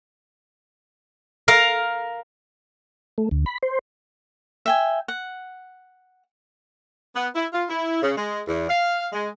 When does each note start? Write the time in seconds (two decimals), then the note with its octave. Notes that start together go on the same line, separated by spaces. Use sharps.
1.48 A#4 F5 A#5
3.18 A3
3.31 D2
3.46 B5
3.63 C5
4.66 E5 G5 G#5
5.08 F#5
7.16 B3
7.35 E4
7.53 F4
7.69 E4
8.03 C#3
8.17 G#3
8.48 E2
8.70 F5
9.13 G#3